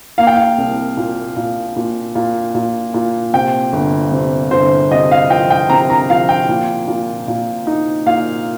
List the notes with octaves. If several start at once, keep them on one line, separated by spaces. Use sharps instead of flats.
A#3 F5
G5
F5
C2
A#2
A#2
A#2
A#2
A#2
A#2
C3 G5
G1
C3
G1 C5
C3 D#5
F5
F3 G5
G5
C3 A#5
A#5
F3 F5
G5
A#2
A#2
A#2
D#4
A#2 F5